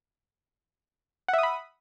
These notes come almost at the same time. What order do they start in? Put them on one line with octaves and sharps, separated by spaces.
F#5 E5 D#6 B5